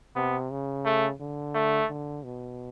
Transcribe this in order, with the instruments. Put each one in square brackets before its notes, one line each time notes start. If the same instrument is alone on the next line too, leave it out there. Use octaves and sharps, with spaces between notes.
[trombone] C3 [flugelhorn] B3
[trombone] C#3
[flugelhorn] A3
[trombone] D3
[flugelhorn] A3
[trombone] D3
B2